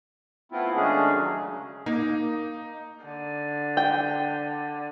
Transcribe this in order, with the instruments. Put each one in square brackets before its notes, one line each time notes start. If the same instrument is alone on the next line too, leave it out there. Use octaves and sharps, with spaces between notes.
[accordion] A3 B3 C4 E4 F4
D#3 G#3 A3 C#4 D4 G#4
F#3
C#3
[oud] A#3 [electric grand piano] D#4
[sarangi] D3
[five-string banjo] G5